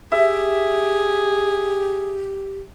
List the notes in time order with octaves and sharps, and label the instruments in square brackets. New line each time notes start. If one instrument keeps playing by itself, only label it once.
[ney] G4 [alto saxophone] G#4 [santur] E5